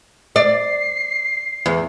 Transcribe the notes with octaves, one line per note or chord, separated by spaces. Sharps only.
D5 C7
E2